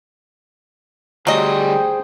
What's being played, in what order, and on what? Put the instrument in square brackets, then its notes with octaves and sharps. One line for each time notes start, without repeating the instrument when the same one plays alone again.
[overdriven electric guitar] D2 G3 [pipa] F#3 D#5 [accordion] G#4 C5 G5